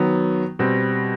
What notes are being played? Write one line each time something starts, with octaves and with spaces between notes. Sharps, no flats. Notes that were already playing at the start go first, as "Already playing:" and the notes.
Already playing: D#3 F#3 B3
B2 G3 C4